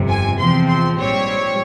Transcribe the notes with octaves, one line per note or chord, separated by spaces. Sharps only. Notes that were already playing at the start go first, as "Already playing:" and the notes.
Already playing: G1 F2 C3
G#5
E2 C3 F3 C4 C6
C6
A#1 G#2 G3 C4 C#5